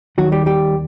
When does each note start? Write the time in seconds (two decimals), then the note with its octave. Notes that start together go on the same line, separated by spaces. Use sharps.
0.18 D#2 D#3 F#3 F#4
0.32 G3 G4
0.46 G3 G4